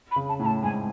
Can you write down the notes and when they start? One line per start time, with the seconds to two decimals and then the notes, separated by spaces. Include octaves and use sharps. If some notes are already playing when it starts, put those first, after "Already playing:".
0.11 B5
0.16 C#3
0.28 A5
0.40 A2 B5
0.45 A5
0.63 G#2 G#5